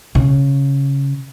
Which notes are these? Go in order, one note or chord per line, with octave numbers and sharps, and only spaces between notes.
C#3